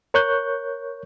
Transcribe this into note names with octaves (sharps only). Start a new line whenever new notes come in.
A#4 C#5 C#6 F#6 G6